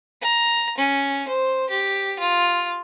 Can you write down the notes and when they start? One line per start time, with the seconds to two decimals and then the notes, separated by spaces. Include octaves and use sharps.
0.22 A#5
0.78 C#4
1.28 C5
1.70 G4
2.20 F4